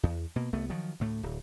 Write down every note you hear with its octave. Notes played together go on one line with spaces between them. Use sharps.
E2
B2 A#3
C2 A3 B3
D#3 F3 F#3
D2 A2 A3
D1